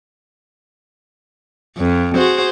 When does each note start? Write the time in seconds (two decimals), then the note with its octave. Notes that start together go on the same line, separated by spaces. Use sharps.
1.78 F2
2.16 F#4 G#4 C5